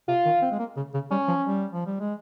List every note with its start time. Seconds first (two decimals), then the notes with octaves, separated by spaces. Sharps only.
0.08 C3 F4
0.25 D#3
0.42 C4
0.51 G#3
0.59 A#3
0.76 C#3
0.94 C#3
1.11 G3 C#4
1.28 F3
1.45 G3
1.73 F3
1.86 G3
2.00 G#3